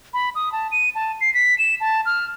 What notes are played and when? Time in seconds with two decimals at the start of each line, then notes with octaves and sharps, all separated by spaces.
0.14 B5
0.35 D#6
0.52 A5
0.72 D#7
0.95 A5
1.21 C7
1.34 B6
1.59 E7
1.80 A5
2.06 F6